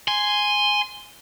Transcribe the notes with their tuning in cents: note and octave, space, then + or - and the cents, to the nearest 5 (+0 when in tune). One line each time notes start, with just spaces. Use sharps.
G#5 +0 C6 +0